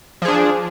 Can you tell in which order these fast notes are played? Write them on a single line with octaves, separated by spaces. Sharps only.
F3 G#4 D4